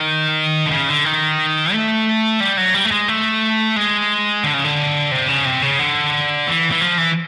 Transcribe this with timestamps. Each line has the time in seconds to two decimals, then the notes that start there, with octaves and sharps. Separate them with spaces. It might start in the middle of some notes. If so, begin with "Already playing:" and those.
Already playing: D#3
0.66 D3
0.71 C#3
0.88 D3
1.05 D#3
1.73 A3
2.40 G3
2.57 F#3
2.74 G3
2.85 A3
2.91 G#3
3.08 A3
3.76 G#3
4.44 D3
4.54 C#3
4.64 D3
5.12 C3
5.28 C#3
5.45 C3
5.62 C#3
5.79 D3
6.47 E3
6.72 E3
6.81 F3
6.98 E3